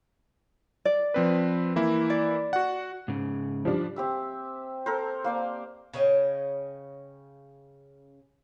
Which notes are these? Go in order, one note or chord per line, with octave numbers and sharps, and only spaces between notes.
D5
F3 C4 B4
E3 A#3 E4
D5
F#4 F#5
G#2 C#3
F3 G3 D4
C4 G4 E5
A4 A#4 C5
A#3 C5 D5
C#3 C#4 D#5 G5